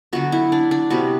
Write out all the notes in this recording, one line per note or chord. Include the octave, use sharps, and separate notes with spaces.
D3 F#3 B3 F#4
E4
D4
D4
C3 G3 B3 F#4